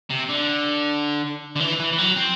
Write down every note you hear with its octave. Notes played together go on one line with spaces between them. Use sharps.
C3
D3
D3
E3
E3
E3
F#3
C4